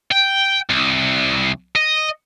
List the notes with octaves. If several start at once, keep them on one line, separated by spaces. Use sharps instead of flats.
G5
C2
D#5